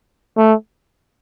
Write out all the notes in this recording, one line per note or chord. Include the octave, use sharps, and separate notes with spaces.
A3